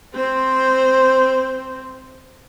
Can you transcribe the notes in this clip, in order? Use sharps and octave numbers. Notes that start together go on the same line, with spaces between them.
C4 C5